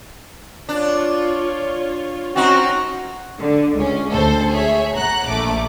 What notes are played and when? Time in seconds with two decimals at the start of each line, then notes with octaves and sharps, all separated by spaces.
0.69 D4 F4 C#5
2.36 C4 C#4 D#4 F#4 C5 A#5
3.39 D3
3.76 C#2 C#4
4.10 D2 A4 C5
4.51 G#4 C#5 E5
4.97 F#5 A#5 F#6
5.27 A#1 A3 D6